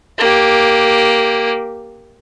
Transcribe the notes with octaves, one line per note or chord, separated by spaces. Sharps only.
A#3 G4